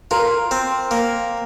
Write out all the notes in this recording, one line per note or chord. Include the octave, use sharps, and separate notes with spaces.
F4 A#4
C4
A#3